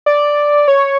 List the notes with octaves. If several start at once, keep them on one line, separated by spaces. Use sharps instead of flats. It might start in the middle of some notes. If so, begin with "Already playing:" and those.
D5
C#5